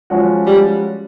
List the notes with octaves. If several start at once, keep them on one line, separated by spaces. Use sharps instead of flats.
F3 G#3 C#4 F#4
G3